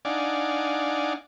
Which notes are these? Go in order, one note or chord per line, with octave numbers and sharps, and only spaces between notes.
D4 D#4 D5 F5 F#5 G#5